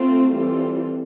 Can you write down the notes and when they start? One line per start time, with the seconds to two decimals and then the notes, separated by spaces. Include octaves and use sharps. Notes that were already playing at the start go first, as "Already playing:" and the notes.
Already playing: A3 C4 F4
0.30 E3 G3 C4 F4 A4